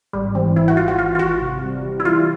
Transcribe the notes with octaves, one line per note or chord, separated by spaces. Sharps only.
G#1 G3
E3 C4
G#1 E4
F#4
G#1 F4
F#4
E3 F4
F4
G#1 F#4
C3
G3
E3
E4
G3 F4